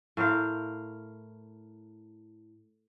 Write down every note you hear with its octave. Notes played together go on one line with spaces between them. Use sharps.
A2 A#4 C5 F5